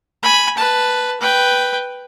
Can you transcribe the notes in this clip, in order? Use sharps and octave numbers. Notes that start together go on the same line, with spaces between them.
G#5 B5
B4 A5
B4 G5